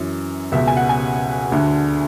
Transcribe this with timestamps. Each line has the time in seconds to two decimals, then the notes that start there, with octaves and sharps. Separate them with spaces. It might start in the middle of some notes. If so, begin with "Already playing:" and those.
Already playing: F#2 E3
0.52 C#2 B2 E5
0.67 G#5
0.77 F#5
0.89 G#5
1.52 D2 D3